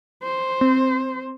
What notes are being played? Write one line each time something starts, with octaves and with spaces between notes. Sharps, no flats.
C5
C4